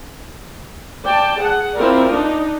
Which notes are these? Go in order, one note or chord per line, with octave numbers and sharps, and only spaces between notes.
D5 G5 A5
G#4 F#5
C4 E4 F4 A#4 D5
D4 D#4